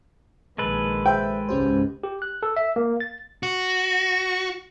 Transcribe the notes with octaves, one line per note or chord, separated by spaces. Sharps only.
A#1 A#2 D#3 G#3 A4 B4
C5 E5 G5
C#2 G#2 C#4 G4 C5
G4
F#6
A4
E5
A#3
A6
F#4